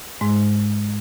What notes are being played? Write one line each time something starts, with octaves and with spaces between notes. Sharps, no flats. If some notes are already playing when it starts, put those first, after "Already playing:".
G#2 G#3